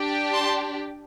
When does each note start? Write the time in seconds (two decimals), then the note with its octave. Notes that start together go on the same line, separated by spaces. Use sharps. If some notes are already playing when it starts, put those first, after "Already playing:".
Already playing: D4 G4
0.33 A5 C6